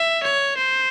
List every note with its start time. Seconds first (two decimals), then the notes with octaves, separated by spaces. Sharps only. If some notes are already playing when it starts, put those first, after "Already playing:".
Already playing: E5
0.24 C#5
0.57 C5